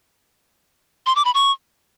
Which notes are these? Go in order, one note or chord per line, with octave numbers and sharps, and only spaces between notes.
C6
D6
B5
C#6